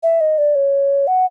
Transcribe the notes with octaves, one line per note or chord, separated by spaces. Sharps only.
E5
D#5
D5
C#5
F#5